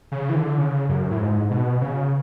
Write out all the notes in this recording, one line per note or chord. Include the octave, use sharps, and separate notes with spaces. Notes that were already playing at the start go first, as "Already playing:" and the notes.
C#3
E3
D3
C#3
F#2
A2
G#2
B2
C#3